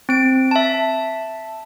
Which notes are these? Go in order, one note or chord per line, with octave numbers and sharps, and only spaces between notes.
C4 D7
E5 A5